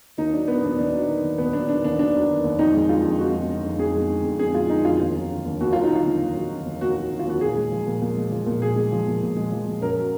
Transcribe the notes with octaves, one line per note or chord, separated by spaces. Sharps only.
D#2 D#4
F#3 D4
D#3 B3
D#2 D4
D#2 D4
F#3
D#3
D#2
D#2 B3
F#3 D4
D#3 D4
D#2 D4
D#2 D4
F#3
D#3
D#2
F2 D#4
G#3
D3 F4
F2
F2 F#4
G#3
D3
F2
F2 G#4
G#3
D3
F2
F2 G#4
G#3 F4
D3 D#4
F2 F4
D#2 F4
F#3
D3
D#2
D#2 F#4
F#3 F4
D#4
D3
F4
D#2
D#2
F#3
D3
D#2
D#2 F#4
F#3
D3
F4
D#2 F#4
A#2 G#4
G#3
F3
A#2
A#2
G#3
F3
A#2
A#2 G#4
G#3
F3
A#2
A#2
G#3
F3
A#2
F#2 A#4
F#3